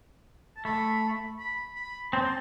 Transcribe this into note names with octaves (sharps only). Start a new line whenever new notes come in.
A5
A3 B5
B5
B5
C4 A5